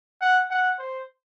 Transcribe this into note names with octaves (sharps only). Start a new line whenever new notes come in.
F#5
F#5
C5